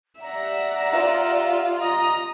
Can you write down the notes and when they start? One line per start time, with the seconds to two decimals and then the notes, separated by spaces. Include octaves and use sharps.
0.21 G4 D5 E5 F#5 A#5
0.91 F4 F5
1.80 D#5 A#5